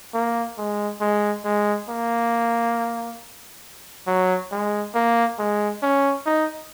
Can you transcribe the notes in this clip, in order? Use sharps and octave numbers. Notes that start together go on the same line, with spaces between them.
A#3
G#3
G#3
G#3
A#3
F#3
G#3
A#3
G#3
C#4
D#4